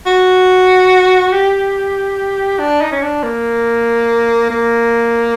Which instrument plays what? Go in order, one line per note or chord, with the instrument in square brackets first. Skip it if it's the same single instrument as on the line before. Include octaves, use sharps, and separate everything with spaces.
[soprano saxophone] F#4
G4
D4
D#4
C#4
D4
A#3
A#3